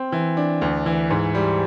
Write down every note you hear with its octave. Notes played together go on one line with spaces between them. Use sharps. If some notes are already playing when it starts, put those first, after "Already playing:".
Already playing: C4
E3
D4
D2
E3
G#2
G3